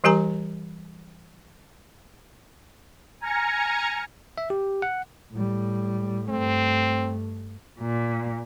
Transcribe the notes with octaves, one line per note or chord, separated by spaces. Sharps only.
E3 G3 G4 A#4 G#5 A#5
G#5 A#5 F6 G#6 A#6 C#7
E5
G4
F#5
A2 G3
G2 A3 C4
A#2